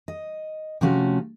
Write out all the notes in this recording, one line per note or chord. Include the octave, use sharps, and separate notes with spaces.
D#5
C3 F3 A3 C#4 F#4